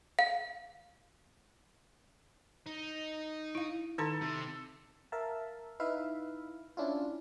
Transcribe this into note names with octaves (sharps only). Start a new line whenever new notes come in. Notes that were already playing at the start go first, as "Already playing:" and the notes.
F5
D#4
E4 F5
D#3 D#4 A4 C6
C3
A#4 E5 F5 A5
D#4 E4 B4 E5 F5
C#4 D4 E4 F4